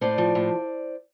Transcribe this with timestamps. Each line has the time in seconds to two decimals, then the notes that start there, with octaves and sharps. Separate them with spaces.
0.01 A2 C5 D5
0.18 F3
0.35 A2